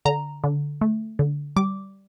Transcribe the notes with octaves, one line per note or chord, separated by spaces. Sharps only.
D3 A#5
D3
A3
D3
G3 D6